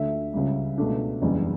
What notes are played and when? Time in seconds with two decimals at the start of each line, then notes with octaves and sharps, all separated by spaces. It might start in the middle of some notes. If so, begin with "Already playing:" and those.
Already playing: D2 D3 A3 E5
0.34 C#2 C#3 G3
0.78 C#2 B2 A3 D4
1.22 F#1 E2 D3 G3